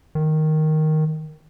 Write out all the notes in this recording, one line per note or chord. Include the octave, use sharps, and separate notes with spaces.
D#3